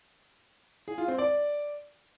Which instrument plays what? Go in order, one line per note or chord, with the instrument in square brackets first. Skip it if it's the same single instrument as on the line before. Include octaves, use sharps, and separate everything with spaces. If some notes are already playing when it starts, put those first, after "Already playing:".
[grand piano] G#4
F4
C4
D5